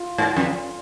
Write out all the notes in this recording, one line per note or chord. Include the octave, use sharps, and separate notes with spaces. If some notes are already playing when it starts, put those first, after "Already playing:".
Already playing: F4
G#2
F2